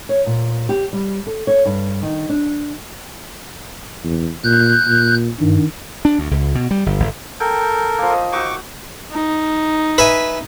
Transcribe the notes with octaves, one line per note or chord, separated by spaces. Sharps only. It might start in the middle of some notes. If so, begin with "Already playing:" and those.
C#5
A#2
G4
G3
A4
C#5
G2
D#3
D4
E2
A#2 F#6 G6
A#2
G2 D#3
D4
D2
C#2
B2
G3
G1
G1
A4 A#4 G5
F3 A#3
D#5
D#4 F#4 C#6 D6 E6
D#4
B4 E5 G#5